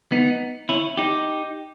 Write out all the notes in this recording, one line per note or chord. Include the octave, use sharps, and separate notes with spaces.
B3 D#4
C#4 E4
D#4 G4